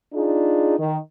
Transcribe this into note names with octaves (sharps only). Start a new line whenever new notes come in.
D4 D#4 F4 G#4
D#3